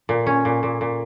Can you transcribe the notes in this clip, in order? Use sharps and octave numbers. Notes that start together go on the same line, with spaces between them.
A#2
C#4
A#2
A#2
A#2